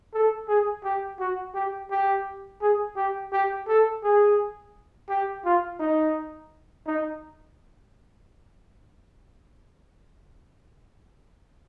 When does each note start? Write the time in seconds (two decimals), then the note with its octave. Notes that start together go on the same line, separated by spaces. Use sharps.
0.13 A4
0.48 G#4
0.84 G4
1.19 F#4
1.54 G4
1.91 G4
2.61 G#4
2.96 G4
3.32 G4
3.67 A4
4.03 G#4
5.09 G4
5.45 F4
5.80 D#4
6.86 D#4